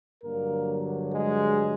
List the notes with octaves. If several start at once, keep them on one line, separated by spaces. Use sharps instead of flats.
G2 D3 F#3 A#3 A#4
G#3 G#4